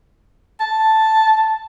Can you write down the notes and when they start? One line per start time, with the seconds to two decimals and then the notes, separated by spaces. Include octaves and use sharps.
0.60 A5